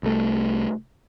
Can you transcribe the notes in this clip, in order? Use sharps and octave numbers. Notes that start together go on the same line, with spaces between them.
C2 A3